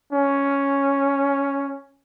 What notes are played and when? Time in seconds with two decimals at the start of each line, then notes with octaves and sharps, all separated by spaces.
0.13 C#4